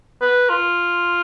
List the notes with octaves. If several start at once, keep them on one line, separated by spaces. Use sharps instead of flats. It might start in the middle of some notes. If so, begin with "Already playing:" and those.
B4
F4